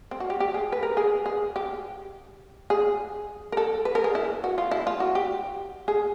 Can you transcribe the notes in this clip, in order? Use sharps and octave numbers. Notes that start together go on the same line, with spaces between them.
C4
F#4
G4
G4
G#4
B4
A#4
G#4
G#4
G4
G#4
A#4
A4
B4
A#4
G#4
E4
F#4
F4
E4
F4
F#4
G4
G#4